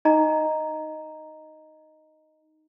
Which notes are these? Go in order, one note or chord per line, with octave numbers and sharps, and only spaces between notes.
D#4 D#5 A#5